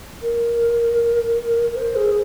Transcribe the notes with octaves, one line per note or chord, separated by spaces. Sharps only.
A#4
C5
G#4